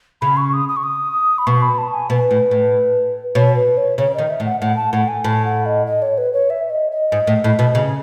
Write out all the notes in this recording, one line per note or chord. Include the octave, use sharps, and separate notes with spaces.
C#3 B5
C#6
D#6
D#6
C#6
D#6
B5
B2 C#6
B5
A5
G#5
B2 B4
A2
A2
B2 C#5
B4
C#5
C#3 C#5
D#3 D#5
E5
A2
F#5
A2 F#5
A5
A2 F#5
G#5
A2 A5
F#5
D#5
D#5
C#5
B4
C#5
E5
D#5
D#5
G#2
A2
A2
B2
C#3